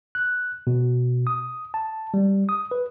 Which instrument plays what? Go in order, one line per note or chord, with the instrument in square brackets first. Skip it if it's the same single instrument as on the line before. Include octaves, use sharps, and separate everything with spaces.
[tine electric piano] F#6
B2
D#6
A5
G3
D#6
B4